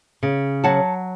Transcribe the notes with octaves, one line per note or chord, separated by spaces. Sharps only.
C#3
F#3 F#5 A5